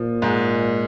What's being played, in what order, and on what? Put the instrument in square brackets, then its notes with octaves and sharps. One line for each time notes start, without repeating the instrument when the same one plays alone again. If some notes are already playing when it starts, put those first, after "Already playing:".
Already playing: [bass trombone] A#2 [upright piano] F3
[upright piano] G#2 G#3